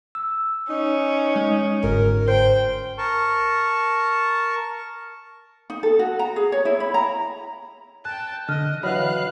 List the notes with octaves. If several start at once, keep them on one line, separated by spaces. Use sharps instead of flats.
E6
C#4 D#4
G#3
G1 G#2 A#4
C5 G5
A#4 A5 C#6
D#4
A4
F#4
A#5
G#4
C#5
E4
B5
A#5
G5 A5 F#6
D3 D#5 F6 F#6
E3 F#3 D#5 F5 B5 F6 F#6